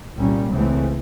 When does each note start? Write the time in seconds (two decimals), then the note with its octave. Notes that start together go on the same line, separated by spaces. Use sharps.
0.16 C2 A#2 G3 A#3 C#4
0.49 C#2 C#3 E3 A3 C4